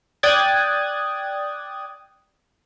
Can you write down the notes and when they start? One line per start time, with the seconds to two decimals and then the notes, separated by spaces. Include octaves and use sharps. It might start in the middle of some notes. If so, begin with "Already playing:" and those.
0.23 D5 G5 D#6 F#6 G#6 A6